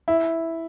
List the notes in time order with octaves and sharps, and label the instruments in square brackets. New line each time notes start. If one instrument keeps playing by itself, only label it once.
[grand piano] E4